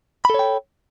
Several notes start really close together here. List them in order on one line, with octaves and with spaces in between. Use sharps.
B5 A4 C#5 G5